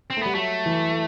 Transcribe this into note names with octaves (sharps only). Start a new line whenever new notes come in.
C4
A3
G3 B3
F#3 A3
E3